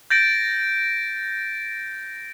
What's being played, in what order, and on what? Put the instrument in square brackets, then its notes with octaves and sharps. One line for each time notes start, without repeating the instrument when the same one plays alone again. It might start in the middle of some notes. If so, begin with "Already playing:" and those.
[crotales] G6 A6 A#6 D7